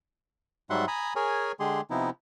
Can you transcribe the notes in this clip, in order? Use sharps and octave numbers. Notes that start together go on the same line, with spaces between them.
G#2 F#3 G3 E5 F#5 C6
G#5 A#5 B5 D#6
G#4 A#4 C#5 G#5
D3 G#3 G4 G#4 C6
C3 F3 B3 D#4 E4